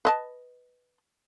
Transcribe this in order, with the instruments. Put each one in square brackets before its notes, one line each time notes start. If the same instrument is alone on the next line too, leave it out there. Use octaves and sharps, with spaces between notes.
[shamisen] B4 D#5 A5